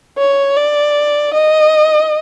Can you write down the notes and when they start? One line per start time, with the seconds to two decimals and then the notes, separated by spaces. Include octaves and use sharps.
0.18 C#5
0.57 D5
1.34 D#5